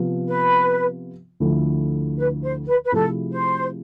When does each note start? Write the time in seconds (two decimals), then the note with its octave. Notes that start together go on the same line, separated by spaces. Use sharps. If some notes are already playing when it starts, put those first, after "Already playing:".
Already playing: C3 F3 B3 F4
0.27 B4
1.40 D2 D3 F3 A3 E4
2.17 B4
2.42 C5
2.67 B4
2.83 B4
2.92 C3 F3 A3 E4 G#4 A4
3.30 C5